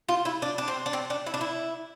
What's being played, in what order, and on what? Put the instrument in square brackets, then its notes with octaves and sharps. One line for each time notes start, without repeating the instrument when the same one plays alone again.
[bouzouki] F4
E4
D4
D4
C4
D4
C4
D4
E4
D4
E4